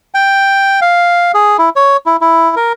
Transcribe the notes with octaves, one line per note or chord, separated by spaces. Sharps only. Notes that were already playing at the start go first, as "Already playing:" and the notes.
G5
F5
G#4
E4
C#5
E4
E4
A#4